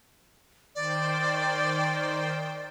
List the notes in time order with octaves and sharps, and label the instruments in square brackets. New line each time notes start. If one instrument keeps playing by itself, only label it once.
[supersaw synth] D#3 C5 G5 [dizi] D5